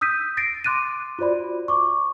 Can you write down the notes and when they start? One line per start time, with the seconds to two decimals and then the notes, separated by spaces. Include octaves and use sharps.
0.01 D#6 E6 G6 B6 D#7
0.37 A6 A#6 C7 D7
0.64 C6 D6 F#6 A6 D#7
1.19 F4 F#4 C5 D5 B5
1.68 C#6 D6